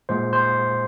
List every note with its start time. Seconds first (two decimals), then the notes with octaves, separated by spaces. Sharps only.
0.09 A#2 G#3 C5
0.33 C5